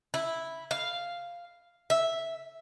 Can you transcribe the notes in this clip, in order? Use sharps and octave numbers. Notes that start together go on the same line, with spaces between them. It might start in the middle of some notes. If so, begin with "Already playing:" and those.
E4
F5
E5